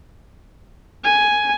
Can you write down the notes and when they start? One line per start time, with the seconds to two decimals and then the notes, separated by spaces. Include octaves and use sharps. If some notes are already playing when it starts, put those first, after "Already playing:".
1.04 G#5